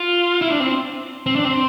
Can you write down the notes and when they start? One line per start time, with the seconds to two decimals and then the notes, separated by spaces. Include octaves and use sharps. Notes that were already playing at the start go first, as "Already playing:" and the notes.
Already playing: F4
0.41 E4
0.50 D4
0.60 C4
1.26 C4
1.35 D4
1.45 C4